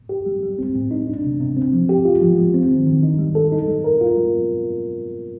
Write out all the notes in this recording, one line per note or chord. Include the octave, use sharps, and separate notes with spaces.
G4
G3
G3
C4
A2
D#4
D4
C3
C3
C4
F3
G4
F4
F3
F3
C4
D#3
D#3
D#4
G3
A4
D#4
G3
A#4
F4
G3